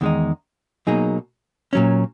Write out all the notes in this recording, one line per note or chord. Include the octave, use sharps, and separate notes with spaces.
E2 D#3 G#3 D#4
B2 F#3 A#3 D#4 G#4
A#2 F#3 C#4